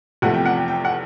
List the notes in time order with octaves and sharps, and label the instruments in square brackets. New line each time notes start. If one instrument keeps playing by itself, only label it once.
[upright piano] F1 E2 C3 F3 A3 F#5
G5
F#5
G5
G5
F#5